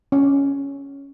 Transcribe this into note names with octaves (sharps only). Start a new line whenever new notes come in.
C#4